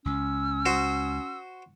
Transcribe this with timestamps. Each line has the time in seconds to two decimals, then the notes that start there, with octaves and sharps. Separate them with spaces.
0.05 C#2 C#4 E6
0.66 F#4 C5